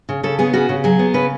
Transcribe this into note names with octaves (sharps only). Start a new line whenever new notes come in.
C#3
C#3 A4
B3 G#4
C#3 F#4
C#3
F#3 G#4
B3
C#3 B4